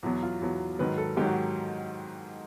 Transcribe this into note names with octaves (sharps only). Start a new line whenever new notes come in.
E2 B2 F#3 F#4
F4
E2 B2 F#3
G#2 D#3 F#3 B4
A4
G#2 D#3 F#3 G4
F#4